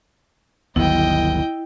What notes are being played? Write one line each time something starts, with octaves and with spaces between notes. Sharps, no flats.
G1 D2 D#3 F#3 B3 E4 D#5 G5